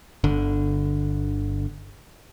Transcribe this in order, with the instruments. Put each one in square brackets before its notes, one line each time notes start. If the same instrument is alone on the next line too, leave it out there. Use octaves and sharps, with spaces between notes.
[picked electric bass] G1 D3